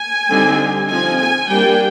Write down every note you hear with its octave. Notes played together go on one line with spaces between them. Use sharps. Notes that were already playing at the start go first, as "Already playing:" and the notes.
Already playing: G#5
D3 G3 C4 D#4
F3 C4 D#4 G#5
G#5
G3 A#3 D4 G5